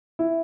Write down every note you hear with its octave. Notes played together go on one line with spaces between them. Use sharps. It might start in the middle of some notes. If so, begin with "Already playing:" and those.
E4